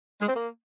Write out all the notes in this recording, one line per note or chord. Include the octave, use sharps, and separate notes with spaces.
G#3
C4
A#3